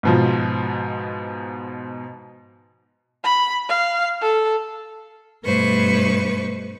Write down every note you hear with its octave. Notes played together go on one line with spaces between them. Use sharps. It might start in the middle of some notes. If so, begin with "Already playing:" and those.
G#2 B2 F3
B5
F5
A4
G2 B2 A3 B4 C5 C#6